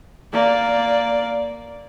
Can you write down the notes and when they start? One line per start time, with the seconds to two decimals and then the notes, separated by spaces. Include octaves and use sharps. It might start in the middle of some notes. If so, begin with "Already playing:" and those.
0.33 A#3 D5